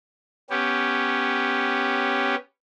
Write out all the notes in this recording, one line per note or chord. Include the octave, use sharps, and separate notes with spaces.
B3 C#4 G4